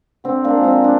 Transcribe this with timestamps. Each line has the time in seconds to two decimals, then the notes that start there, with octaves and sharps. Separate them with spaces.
0.24 D3 C4
0.44 A#3 D4
0.55 F3 G#3
0.64 C4 D#4
0.84 D4